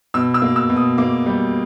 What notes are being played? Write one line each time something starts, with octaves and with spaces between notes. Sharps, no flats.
B2 E6
E6
A#3
E6
B2
D#6
A#3 D6
G3